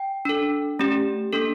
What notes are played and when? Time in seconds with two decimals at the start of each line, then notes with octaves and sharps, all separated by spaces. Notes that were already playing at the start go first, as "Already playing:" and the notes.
Already playing: G5
0.25 D4 A4
0.79 A3 C#4 G4
1.32 A#3 D4 A4